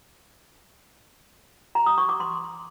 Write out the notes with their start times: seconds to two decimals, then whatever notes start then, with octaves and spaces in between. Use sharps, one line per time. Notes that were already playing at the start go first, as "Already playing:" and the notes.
1.75 A#5
1.86 D#6
1.98 C#6
2.09 D6
2.20 C6